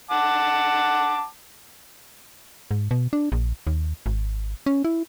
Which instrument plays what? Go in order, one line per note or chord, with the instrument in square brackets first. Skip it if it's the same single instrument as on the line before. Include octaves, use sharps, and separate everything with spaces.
[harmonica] F#5 A5 D6
[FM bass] G#2
B2
D4
A#1
D#2
G#1
C#4
E4